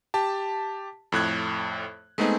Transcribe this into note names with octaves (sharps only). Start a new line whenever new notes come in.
G4 A5
F2 A2 F#6 G#6
G#3 A3 B3 C4 D#4 G#4